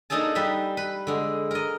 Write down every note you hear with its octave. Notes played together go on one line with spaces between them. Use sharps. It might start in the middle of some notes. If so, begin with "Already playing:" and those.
A#3 D4 D#4 G#4 A4 A5
G3 B4 D#5 E5
B4
D3 G#3
A#4 D#5